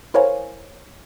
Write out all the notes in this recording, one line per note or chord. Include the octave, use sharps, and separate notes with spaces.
E4 A#4 C5 C#5 F5 G#5